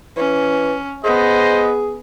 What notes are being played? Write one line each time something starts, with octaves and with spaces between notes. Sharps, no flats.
E3 C#4
B3 G#4 C5 D#5